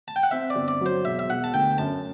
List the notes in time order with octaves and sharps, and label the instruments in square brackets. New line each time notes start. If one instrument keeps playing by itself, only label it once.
[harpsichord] A5
G5
F#5
[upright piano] C4 [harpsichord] E5
[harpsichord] D5
[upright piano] G1
[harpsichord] D5
[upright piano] F#3 [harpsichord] C5
[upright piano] E1 [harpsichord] E5
[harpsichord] E5
[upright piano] E1 [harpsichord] F#5
[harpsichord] A5
[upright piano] D2 [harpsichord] G5
[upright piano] F#2 [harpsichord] A5